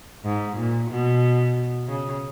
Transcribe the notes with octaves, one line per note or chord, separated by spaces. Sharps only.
G#2
A#2
B2
C#3